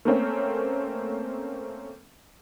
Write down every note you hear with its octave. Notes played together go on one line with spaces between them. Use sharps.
A3 A#3 C4 C#4